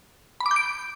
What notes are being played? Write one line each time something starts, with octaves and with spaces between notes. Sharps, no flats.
B5
D6
G6
D7